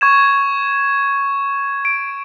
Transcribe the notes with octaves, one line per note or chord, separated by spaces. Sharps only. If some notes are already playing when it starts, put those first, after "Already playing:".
C#6 G#6 E7
D7